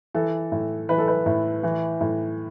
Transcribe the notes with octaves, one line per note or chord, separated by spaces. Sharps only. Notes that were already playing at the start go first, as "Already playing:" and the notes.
E3 A4
A2
E3 B4
A4
B4
A2
E3
A2